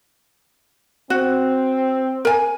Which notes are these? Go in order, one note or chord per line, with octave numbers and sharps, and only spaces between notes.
C4 F#4
A#4 G#5